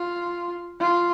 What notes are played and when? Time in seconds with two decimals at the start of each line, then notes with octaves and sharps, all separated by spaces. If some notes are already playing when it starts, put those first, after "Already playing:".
Already playing: F4
0.80 F4